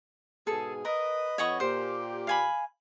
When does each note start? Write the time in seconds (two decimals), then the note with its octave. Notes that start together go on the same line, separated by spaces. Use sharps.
0.47 G#2 B2 G#4 A4
0.85 A#4 B4 D#5
1.38 F2 B4 C#5 D#5 F#5 C#6
1.60 A#2 G4 C5
2.27 F5 G#5 B5